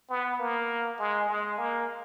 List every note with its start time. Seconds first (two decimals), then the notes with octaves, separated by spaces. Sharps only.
0.09 B3
0.39 A#3
0.99 G#3
1.28 G#3
1.58 A#3